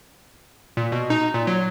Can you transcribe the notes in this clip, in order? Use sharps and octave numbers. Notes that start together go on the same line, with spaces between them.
A#2
B2
D#4
A#2
F#3